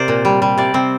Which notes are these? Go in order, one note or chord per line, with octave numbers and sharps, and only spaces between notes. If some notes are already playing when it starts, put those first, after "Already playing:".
Already playing: C3 A#4 C5 D5
A#2
G3
G3
C3 D5
C3 C4